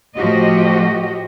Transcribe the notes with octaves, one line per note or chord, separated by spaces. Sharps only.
A2 F3 F#4 G4 D#5